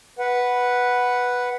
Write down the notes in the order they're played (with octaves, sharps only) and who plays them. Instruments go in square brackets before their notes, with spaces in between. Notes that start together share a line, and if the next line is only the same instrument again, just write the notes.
[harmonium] B4 F#5